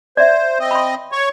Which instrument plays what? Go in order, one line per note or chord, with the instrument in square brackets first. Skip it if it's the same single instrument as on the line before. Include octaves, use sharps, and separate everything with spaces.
[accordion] C5 [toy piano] D5 E5
[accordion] C4 D#5
[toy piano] B5 C6
[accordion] C#5 C#6